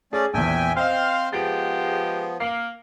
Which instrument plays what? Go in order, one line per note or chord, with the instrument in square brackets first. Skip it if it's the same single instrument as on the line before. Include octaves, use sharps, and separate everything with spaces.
[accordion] A3 C#4 D5 [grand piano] G#4
[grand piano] A#1 E2 [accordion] E5 G5 G#5
[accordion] C4 C5 C6 [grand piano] D#5 G5 [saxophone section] F5
[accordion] F3 B3 [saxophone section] G#3 G4 [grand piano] A6 D7
[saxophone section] A#3 [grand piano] F5 C7